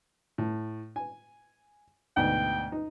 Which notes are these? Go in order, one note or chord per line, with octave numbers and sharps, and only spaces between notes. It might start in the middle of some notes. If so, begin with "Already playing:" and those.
A2
G#5
D2 G#2 B2 G5
D#4